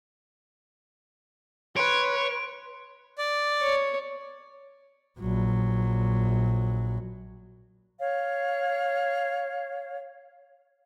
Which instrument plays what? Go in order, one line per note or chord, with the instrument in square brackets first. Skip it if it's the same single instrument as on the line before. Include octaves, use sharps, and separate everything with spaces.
[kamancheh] B4 [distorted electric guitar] C#5 [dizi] C6 [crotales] D7
[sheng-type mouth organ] D5
[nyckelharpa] C#5
[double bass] A#1 F#3
[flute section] C#5 F5